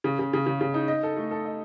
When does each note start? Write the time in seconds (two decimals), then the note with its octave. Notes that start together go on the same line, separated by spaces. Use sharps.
0.04 C#3
0.19 C#3
0.33 C#3
0.46 C#3
0.61 C#3
0.74 D#4
0.88 D#5
1.03 A4
1.17 A3
1.31 A4
1.45 D#5